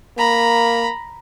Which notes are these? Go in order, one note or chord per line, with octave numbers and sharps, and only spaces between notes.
A#3 A#5 B5